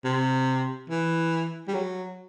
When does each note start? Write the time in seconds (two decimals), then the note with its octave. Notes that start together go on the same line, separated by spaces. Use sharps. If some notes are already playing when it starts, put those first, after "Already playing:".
0.04 C3
0.90 E3
1.68 G3
1.74 F#3